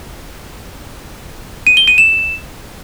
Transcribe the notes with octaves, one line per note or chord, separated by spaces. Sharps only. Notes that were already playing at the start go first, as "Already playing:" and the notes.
D#7
G7
D#7
E7